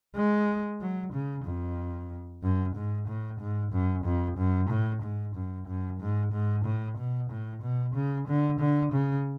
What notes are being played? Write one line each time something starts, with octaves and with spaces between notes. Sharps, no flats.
G#3
F#3
C#3
F2
F#2
G#2
A2
G#2
F#2
F2
F#2
A2
G#2
F#2
F#2
G#2
G#2
A2
B2
A2
B2
C#3
D3
D3
C#3